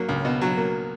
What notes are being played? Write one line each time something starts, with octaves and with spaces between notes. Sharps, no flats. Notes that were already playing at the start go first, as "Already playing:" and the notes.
Already playing: F#3 A#3
C#2
B2
F#3
A#3